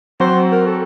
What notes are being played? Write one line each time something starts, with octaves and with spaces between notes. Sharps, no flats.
F#3 C4 F#4 C5
A#4
A4